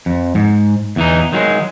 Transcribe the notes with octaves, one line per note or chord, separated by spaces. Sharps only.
F2
G#2
E2 E3 D#4
D#3 F#3 G#3